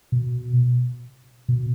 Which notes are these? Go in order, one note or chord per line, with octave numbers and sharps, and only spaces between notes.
B2
B2